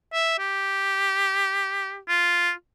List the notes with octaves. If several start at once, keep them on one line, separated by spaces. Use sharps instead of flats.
E5
G4
F4